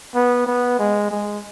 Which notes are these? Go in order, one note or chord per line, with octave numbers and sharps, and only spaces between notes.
B3
B3
G#3
G#3